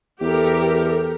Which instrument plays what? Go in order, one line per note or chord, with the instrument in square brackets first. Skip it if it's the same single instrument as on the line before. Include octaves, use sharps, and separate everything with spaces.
[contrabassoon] E2 [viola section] G4 A4 A#4